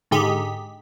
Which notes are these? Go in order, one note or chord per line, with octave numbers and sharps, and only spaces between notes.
G#2 D3 D#4 G4 G#4 B6